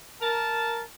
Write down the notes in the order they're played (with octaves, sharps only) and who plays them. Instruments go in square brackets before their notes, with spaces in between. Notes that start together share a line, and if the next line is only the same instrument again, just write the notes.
[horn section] A#4 A5